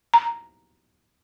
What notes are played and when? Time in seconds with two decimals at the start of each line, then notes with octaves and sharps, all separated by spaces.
0.14 A#5